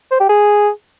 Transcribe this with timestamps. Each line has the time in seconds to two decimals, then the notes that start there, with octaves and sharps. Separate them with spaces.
0.11 C5
0.20 G4
0.29 G#4